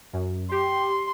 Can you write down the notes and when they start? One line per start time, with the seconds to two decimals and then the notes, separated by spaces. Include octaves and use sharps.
0.13 F#2
0.51 G4 C6